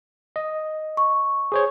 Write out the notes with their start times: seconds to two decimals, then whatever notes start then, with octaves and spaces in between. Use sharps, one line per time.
0.36 D#5
0.97 C#6
1.52 G#4 C5 C#5